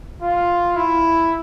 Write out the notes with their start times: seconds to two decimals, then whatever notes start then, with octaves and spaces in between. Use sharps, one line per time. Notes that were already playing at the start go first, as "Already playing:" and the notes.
0.22 F4
0.76 E4